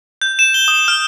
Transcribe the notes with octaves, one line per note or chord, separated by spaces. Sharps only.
G6
E7
G7
D#6
F6